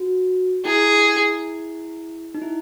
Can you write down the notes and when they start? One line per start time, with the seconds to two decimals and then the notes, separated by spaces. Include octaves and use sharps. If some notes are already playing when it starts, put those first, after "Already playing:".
Already playing: F#4
0.65 E4 G#4
2.34 D#4
2.42 E4